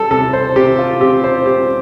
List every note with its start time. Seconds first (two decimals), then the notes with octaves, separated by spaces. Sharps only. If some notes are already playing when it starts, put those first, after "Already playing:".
Already playing: G3 A4
0.11 C3 A4
0.33 C5
0.56 C3 G4
0.78 F4
1.00 C4 G4
1.24 C5
1.46 G3 G4